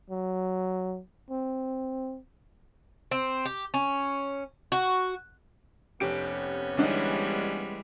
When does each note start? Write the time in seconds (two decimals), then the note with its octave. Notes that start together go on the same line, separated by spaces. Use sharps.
0.10 F#3
1.30 C4
3.11 C4
3.45 G4
3.74 C#4
4.72 F#4
6.00 F1 C3 B3 C#4 G4 D7
6.77 D2 E3 G3 G#3 D4 D#4